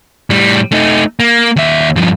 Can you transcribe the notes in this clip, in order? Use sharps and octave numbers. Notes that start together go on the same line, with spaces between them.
A2 G3
A3 D#4
A#3
D#2 E5
G2 F3